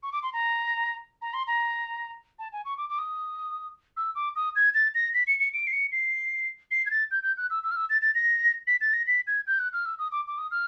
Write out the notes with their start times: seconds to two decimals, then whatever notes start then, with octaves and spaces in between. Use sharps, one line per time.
0.03 C#6
0.12 D6
0.23 C6
0.33 A#5
1.22 A#5
1.34 C6
1.47 A#5
2.39 A5
2.52 G#5
2.65 C#6
2.78 D6
2.90 D6
2.99 D#6
3.97 E6
4.15 D6
4.36 D#6
4.56 G#6
4.74 A6
4.95 A#6
5.14 B6
5.27 C#7
5.40 C#7
5.54 D7
5.67 C7
5.73 C#7
5.92 C7
6.71 C7
6.86 G#6
6.91 A6
7.11 G6
7.23 G6
7.37 F#6
7.50 E6
7.63 E6
7.71 F6
7.76 E6
7.90 A6
8.02 A6
8.15 A#6
8.67 B6
8.81 A6
8.93 A#6
9.07 B6
9.27 G#6
9.47 G6
9.59 F#6
9.73 F6
9.86 E6
9.99 D#6
10.12 D6
10.27 D6
10.38 D#6
10.51 F6